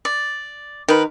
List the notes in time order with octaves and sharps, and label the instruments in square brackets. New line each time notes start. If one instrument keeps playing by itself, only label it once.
[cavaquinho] D5
[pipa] D#3 [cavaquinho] A#4 B4